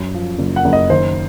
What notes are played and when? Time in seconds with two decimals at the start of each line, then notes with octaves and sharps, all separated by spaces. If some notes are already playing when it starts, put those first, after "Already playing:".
Already playing: F#2
0.14 F3
0.39 F#1
0.56 F#5
0.65 F#1
0.73 D#5
0.90 D#3 C5